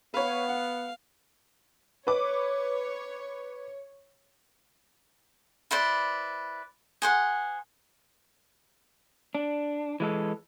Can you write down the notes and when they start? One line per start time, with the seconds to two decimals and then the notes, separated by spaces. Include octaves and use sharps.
0.14 B3 B4 C#5 F5
0.49 F#5
2.07 B4 C#5 D6
5.71 E4 B4 C5 D5
7.02 G#4 C5 F#5
9.35 D4
10.00 E3 G#3 A4